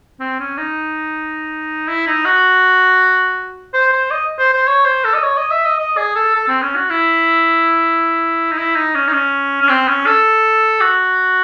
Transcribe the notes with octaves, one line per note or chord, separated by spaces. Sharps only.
C4
C#4
D#4
E4
D#4
F#4
C5
C5
D#5
C5
C5
C#5
C5
A4
D#5
C#5
D#5
E5
D#5
D#5
G#4
A4
A4
C4
C#4
F#4
E4
D#4
E4
D#4
C#4
D#4
C#4
C#4
C4
C#4
A4
F#4